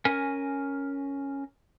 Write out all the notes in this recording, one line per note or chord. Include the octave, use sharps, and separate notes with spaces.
C#4 A#4 G#5